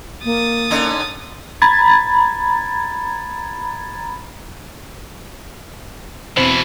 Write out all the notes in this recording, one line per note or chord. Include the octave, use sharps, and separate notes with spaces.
A#3 D#6 A6
D3 C#4 D#4
A#5 B5 G#6 A6
E2 B2 E3 C4 C5